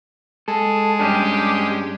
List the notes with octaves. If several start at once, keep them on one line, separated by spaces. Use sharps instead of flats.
G#3 A4
G2 C#4 D4 G4 G5